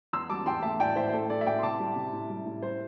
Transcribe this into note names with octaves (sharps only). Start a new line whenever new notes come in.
E2 C6 E6
G3 A5 D6
E2 G5 C6
A3 E5 A5
A2 D5 G5
A2 C5 E5
C5
A3 A4
A2 A4 D5
E5
A2 D5 G5
C6
C3 A5 D6
G3
C3
A2
G3
A2
G3 C5